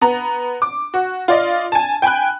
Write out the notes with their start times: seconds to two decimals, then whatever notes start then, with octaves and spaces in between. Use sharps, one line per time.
0.01 B3 A#5
0.62 D6
0.94 F#4
1.28 F4 D5 D#5
1.72 G#5 A5
2.02 G5 G#5 B5 F#6